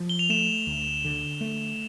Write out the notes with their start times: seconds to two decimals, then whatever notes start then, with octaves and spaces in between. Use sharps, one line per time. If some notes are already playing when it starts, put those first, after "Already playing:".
Already playing: F3
0.09 G7
0.19 F7
0.29 A3 E7
0.67 D2
1.04 D3
1.41 A3